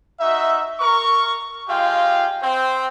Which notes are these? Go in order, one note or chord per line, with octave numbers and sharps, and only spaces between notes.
D#4 F#4 E5
A#4 C#6
G#3 F4 G4 F5 G5
C4 G5